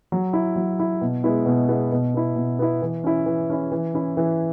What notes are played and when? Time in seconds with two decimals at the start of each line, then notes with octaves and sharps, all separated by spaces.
0.12 F#3
0.33 E4
0.56 F#3
0.79 E4
1.01 B2
1.24 G#3 B3 E4
1.46 B2
1.68 G#3 B3 E4
1.92 B2
2.14 B3 E4
2.36 B2
2.59 B3 E4
2.82 E3
3.04 C#4 E4
3.26 E3
3.50 C#4 E4
3.72 E3
3.94 C#4 E4
4.17 E3